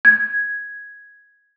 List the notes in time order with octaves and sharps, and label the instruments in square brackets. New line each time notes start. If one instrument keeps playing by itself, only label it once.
[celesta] G#6